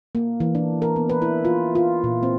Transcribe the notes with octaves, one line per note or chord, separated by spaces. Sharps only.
A#3
E3
D4
A#4
B3
B4
E4
F4
F4
A#2
C4